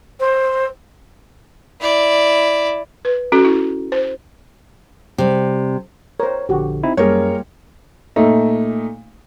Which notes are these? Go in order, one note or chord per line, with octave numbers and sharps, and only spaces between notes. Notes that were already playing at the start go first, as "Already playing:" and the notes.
C5
E4 D5
B4
C#4 F#4 A4
E4
C5
C3 G3
A#4 C5 C#5
A#1 D3 F#4 G4
C4 D#4 E4
F#2 G3 A#3 F4 G#4 A#4 C#5
A#2 A3 D#4